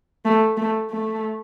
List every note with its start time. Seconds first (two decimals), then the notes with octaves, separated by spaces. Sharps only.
0.25 A3
0.57 A3
0.90 A3